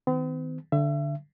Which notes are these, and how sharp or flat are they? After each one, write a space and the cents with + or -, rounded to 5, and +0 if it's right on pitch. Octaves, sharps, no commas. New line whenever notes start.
D#3 +20 C4 -45
D3 +0 E5 +35